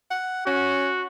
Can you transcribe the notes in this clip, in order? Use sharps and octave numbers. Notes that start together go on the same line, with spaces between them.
F#5
C#4 F#4